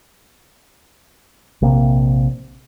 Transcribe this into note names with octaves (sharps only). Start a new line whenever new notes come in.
A#1 C3 A#3